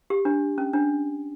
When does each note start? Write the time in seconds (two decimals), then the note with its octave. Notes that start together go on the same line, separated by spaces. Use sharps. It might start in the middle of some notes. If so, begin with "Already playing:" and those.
0.10 G4
0.25 D4
0.58 C#4
0.73 D4